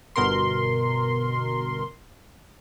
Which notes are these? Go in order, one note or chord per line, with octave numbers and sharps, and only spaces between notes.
G1 B2 A#4 C6